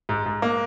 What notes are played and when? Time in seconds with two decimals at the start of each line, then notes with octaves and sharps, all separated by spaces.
0.09 G#2
0.26 G#2
0.42 A#3